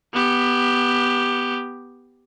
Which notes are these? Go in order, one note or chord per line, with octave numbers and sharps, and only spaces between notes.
B3 G4